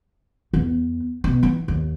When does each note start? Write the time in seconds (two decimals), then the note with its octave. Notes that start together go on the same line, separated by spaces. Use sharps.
0.53 E2 B3
1.24 B2 B3
1.43 E3 D#4
1.68 D#2